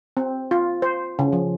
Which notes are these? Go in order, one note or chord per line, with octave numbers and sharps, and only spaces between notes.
C4
F4
C5
C#3
F3